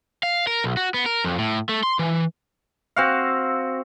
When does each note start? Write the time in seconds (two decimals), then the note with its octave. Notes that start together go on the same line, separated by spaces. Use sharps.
0.23 F5
0.47 A#4
0.64 B1
0.77 F#4
0.94 B3
1.06 A#4
1.24 F2
1.38 A2
1.69 A3
1.83 C6
1.99 E3
2.96 C4 F#4 F5